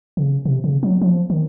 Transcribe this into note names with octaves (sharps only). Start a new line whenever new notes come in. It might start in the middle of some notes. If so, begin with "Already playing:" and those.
C#3
C3
C#3
F#3
F3
D#3